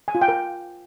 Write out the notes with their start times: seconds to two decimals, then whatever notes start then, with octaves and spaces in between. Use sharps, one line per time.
0.08 G#5
0.15 F4
0.22 G5
0.28 A#4